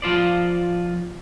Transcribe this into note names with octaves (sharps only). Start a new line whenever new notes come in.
F3 F4 C5 D5